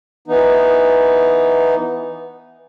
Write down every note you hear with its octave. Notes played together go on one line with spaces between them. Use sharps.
E3 B3 D#4